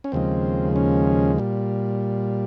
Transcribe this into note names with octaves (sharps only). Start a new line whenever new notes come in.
C#4
D#2 C#3 F3 G#3 C4
C#4
A#2 G3